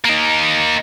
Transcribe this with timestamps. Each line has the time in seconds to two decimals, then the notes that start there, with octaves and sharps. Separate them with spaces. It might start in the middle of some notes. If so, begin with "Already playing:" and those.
0.05 A#3 D#4